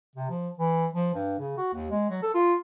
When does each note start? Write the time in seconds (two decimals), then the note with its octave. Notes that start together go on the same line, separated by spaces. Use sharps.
0.16 C3
0.30 F3
0.58 E3
0.93 F3
1.14 G2
1.39 C#3
1.57 F#4
1.73 D#2
1.91 G#3
2.10 F#3
2.22 A4
2.34 F4